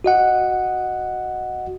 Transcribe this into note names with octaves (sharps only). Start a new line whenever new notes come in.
F#4 D#5 F#5